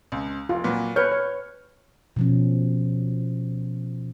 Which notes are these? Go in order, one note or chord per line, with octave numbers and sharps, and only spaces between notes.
C#2
F1 F4
A#2 F#3 B4
B4 C#5 F6 G6 C#7
C#5
B2 F3 C#4